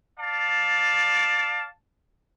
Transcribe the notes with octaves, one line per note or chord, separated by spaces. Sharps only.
D5 F5 A5